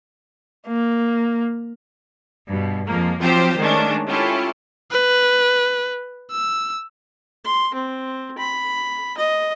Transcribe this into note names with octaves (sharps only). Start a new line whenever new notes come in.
A#3
G2 B2
F2 F3 G#3 A#3
F3 F#3 C4 F4 G4 C5
D#3 G#3 A3 C#4 D4
C#4 E4 F4 G4 A4
B4
E6
C6
C4
B5
D#5